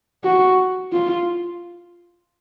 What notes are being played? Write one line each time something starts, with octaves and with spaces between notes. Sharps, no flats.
F#4
F4